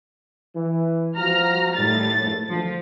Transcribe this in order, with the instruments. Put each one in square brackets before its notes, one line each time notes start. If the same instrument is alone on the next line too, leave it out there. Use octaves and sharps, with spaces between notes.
[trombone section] E3
[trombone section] F3 F#4 [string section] A#5 F6
[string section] A2 A6 [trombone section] D#3 G3
[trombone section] A#1
[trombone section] D2 C5 [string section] F3